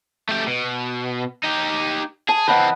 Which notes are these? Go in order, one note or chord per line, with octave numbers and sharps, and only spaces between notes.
A3 G4
B2
D#4 G4
G#4 A5
E3 C4 B4 D#5 F#5